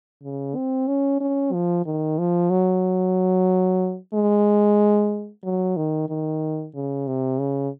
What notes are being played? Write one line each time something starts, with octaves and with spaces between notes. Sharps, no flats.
C#3
C4
C#4
C#4
F3
D#3
F3
F#3
G#3
F#3
D#3
D#3
C#3
C3
C#3